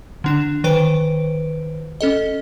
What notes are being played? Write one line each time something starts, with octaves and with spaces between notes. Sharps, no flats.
D3 D4 E7
D#3 B4 C5 D7
C#4 A4 D#5